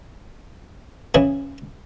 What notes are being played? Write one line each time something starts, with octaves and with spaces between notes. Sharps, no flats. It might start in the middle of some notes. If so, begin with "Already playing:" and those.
C#3 E3